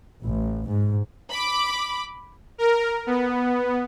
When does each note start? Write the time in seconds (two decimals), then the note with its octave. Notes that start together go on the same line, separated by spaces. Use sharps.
0.24 A1
0.69 G#2
1.31 B5 D6
2.58 A#4
3.07 B3